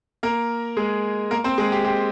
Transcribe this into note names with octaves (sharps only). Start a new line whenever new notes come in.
A#3 A#4
G#3 G#4
A#3 A#4
C4 C5
G#3 G#4
G4
G4